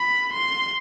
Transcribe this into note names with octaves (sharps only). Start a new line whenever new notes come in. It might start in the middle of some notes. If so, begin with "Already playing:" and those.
Already playing: B5
C6